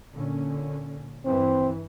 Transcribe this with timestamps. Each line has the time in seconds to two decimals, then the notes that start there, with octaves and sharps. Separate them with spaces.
0.13 A#2 D3 C#4
1.26 G2 E3 C4